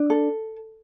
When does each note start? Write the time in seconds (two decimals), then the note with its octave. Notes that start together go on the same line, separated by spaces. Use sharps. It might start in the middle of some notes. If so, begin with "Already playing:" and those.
Already playing: D4
0.10 A4